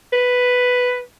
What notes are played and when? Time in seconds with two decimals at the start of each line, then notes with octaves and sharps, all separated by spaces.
0.13 B4